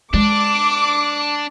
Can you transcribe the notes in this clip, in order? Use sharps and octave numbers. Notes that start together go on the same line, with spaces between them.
G#3 D4 D6